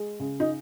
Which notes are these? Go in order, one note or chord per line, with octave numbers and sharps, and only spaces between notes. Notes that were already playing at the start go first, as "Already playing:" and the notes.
Already playing: G#3
C#3
D#4